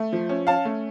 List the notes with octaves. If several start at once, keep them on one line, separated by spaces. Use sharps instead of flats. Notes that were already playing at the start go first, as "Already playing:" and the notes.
Already playing: A3
F3
C#4
C#4 F5 A5
A3